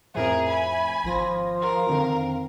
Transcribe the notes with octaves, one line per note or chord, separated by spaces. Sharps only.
F2 A2 F3 G#4 A#4 E5
G#5 B5
G#1 F3 A#6
A#4 F5
F2 D3 D#3 C4